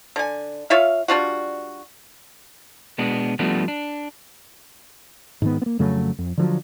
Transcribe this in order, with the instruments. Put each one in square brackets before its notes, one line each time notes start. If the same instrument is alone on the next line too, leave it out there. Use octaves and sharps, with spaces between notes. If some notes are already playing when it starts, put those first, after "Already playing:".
[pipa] D3 G#5
F4 C#5 E5 F5
G3 D4 F4 F#4
[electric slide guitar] B2 G#3 B3 D4
F3 G3 A3 B3 D4 F#4
D4
[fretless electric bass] G#2 D#3 B3
A#3 B3
F2 C#3 F#3 A3
F2
D3 F3 F#3